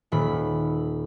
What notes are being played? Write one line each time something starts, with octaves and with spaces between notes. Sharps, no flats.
D#1 B5